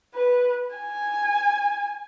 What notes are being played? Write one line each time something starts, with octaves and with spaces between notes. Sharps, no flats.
B4
G#5